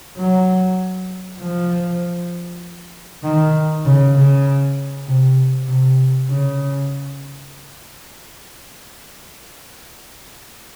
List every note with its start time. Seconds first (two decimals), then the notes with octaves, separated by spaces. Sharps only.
0.18 F#3
1.40 F3
3.24 D#3
3.86 C#3
4.16 C#3
5.08 C3
5.68 C3
6.30 C#3